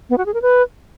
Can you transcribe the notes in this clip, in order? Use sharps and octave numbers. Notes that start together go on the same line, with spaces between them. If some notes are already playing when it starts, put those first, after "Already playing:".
B3
F#4
G#4
A#4
B4